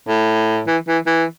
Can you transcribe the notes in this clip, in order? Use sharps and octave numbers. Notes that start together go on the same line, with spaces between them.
A2
E3
E3
E3